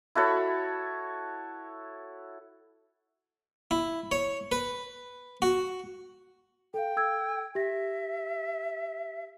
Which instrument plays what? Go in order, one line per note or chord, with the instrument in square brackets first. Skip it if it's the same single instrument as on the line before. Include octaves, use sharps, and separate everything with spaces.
[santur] E4 F#4 A4 C#5
[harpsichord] E4
C#5
B4
F#4
[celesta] A4 F5 [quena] G5
[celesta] A4 E6 G#6
[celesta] G4 A#6 [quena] E5